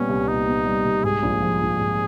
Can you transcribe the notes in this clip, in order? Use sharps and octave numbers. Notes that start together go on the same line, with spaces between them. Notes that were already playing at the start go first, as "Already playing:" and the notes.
Already playing: A#2 G3 B3 C#4
C2
A#2 D#4
B3
G3
C2
G#2 G#4
A#1
F3
A#1
G#2